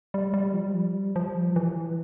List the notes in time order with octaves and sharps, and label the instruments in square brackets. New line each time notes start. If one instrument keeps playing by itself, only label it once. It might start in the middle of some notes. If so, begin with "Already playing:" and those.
[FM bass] G3
G3
F3
G3
F3
E3